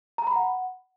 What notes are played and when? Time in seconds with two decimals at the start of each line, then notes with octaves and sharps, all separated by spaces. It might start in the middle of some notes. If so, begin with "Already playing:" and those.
0.18 A#5
0.27 B5
0.36 F#5